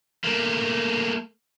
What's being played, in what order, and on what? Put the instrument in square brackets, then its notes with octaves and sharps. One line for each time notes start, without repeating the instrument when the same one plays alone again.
[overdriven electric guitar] A3 A#3